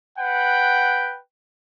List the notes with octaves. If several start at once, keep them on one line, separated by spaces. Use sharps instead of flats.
B4 F#5 G5